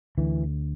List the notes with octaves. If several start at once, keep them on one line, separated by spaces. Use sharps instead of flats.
D2 D3 E3